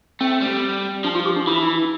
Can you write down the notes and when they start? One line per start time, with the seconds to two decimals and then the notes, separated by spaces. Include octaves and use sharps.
0.21 A3 C4
0.41 G3
1.04 F3 D4
1.15 F4
1.26 G4
1.36 D4
1.47 E3 E4